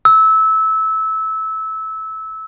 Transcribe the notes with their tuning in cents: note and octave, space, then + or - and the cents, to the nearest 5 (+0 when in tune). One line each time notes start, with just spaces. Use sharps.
E6 -20